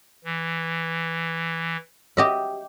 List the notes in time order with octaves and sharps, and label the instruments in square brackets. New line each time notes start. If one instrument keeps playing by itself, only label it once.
[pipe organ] E3
[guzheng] G4 D#5 E5